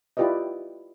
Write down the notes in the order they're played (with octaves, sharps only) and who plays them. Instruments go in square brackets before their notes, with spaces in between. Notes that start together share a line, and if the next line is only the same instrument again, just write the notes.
[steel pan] E4 F4 G4 B4 D5 D#5